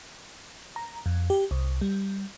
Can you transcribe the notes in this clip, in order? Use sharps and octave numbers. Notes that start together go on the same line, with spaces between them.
A#5
F2
G4
C2
G3